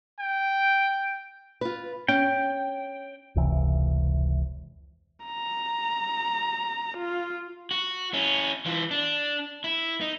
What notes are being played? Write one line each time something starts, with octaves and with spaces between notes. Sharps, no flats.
G5
F4 B4
C#4 G5
F1 C#2 C3 E3
A#5
F4
F#4
C#4 E4
E3 F4
D4
E4
D#4